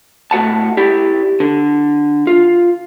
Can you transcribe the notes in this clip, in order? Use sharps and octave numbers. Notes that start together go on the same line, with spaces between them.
A2 F#4 F#5 A5
E4 G4 D5
D3
F4